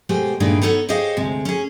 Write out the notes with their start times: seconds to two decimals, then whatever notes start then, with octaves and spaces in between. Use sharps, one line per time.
0.09 B2 G#3 A3 G4 C5
0.40 G2 A#2 D#3 G#3 A3 D4
0.62 B3 D#4 A4 C#5 F#5
0.89 G4 G#4 C5 C#5 D#5 F5
1.17 D2 C3 G#3
1.45 C#4 G#4